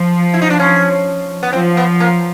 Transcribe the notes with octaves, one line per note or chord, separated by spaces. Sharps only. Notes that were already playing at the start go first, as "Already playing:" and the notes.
Already playing: F3
E4
D#4
D4
C#4
B3
F3 C4
B3
A#3